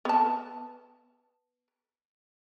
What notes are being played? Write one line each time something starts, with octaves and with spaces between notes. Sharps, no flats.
B3 A5